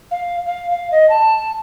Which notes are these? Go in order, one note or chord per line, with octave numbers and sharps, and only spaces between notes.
F5
F5
F5
D#5
A5